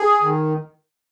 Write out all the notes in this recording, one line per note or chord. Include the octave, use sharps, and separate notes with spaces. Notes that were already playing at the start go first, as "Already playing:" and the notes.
Already playing: G#4
D#3